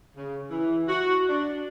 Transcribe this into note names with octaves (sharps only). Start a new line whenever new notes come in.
C#3
E3
F#4
D4